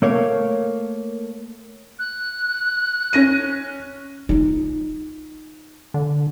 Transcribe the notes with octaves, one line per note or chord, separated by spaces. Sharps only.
A3 A#3 C#5
F#6
C#4 A#6 D#7
D#4 F4
D3